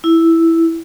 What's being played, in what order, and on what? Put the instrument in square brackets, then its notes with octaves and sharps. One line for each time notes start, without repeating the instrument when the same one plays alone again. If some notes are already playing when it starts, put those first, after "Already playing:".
[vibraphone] E4